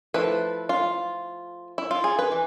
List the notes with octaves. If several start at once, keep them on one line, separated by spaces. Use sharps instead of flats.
F3 A3 E4 B4
F4
E4
F4
G#4
B4
E3